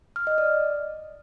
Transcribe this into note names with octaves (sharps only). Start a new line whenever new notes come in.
F6
D#5
D5